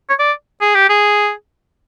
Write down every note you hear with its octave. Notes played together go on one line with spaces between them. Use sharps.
C#5
D5
G#4
G4
G#4